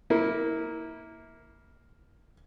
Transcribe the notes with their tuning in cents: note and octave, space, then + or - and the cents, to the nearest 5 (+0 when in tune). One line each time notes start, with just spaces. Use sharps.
A#3 +0 E4 -25